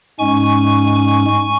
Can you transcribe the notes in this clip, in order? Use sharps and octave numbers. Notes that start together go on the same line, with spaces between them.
G#2 G#3 C#4 G#5 C#6
G#5 C#6